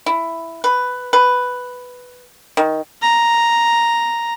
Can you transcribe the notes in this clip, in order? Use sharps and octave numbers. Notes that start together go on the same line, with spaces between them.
E4
B4
B4
D#3
A#5